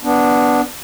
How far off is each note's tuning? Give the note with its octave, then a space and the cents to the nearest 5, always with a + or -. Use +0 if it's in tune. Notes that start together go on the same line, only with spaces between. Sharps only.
B3 +0 D4 -5